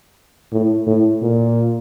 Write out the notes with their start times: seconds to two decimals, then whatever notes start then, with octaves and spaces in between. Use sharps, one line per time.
0.53 A2
0.87 A2
1.22 A#2